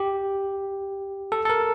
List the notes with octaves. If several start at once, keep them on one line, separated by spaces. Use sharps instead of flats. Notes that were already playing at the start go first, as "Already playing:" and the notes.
Already playing: G4
A4
A4
A#4